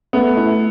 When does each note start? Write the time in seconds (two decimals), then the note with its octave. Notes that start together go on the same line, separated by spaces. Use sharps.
0.13 A3 B3
0.37 E4